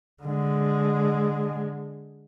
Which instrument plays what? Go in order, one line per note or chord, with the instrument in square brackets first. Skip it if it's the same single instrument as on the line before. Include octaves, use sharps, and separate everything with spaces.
[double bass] D3 G#3